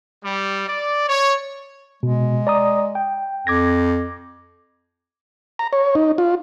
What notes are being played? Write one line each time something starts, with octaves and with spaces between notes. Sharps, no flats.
G3
D5
C#5
B2 G#3
D5 A#5 D#6
G5
F2 D6 G#6 A#6
A#5
C#5
D#4
F4